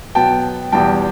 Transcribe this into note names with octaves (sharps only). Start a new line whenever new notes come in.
B2 F#3 B3 G5 A5
E2 B2 G3 B3 G5 A5